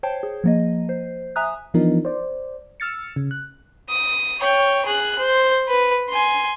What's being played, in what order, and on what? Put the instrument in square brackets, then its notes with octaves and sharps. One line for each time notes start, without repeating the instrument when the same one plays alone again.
[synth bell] C5 C#5 G5 A5
G#4
F3 A#3 D#5
C5
E5 G#5 A#5 D#6 F#6
[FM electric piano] E3 F3 B3 D4 D#4 A#4
C5 D5
E6 F6 A6 C#7
C#3
F#6
[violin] D#6
C#5 G5
G#4 F#6
C5
B4
G#5 C6